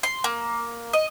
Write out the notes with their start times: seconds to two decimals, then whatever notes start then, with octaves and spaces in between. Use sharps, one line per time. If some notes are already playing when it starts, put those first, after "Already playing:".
0.03 C6
0.24 A#3
0.93 D#5